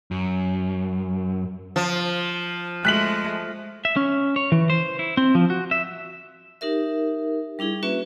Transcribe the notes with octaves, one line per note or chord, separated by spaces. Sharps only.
F#2
F3
G#3 A3 F#6 B6 F#7
E5
C#4
C#5
E3
C5
E4
C4
F3
F#4
E5
D#4 G4 A#4 E5
G3 D4 E4 G#4
A#3 C#4 F#4 B4 E5